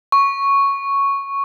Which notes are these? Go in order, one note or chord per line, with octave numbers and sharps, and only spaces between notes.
C#6